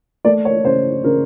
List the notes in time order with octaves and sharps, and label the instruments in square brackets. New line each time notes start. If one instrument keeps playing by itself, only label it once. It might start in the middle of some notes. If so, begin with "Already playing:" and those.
[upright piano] A3 D5
C#5
C#3 C5
C#3 A#4